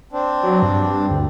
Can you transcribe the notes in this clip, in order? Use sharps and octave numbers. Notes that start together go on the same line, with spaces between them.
C4 D4
F#3
G2
D2